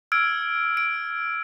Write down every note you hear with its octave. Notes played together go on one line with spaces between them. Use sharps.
E6 F6 G#6 D7
D7